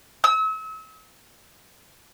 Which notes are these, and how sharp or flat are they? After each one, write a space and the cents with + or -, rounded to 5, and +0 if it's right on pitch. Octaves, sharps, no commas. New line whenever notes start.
E6 -40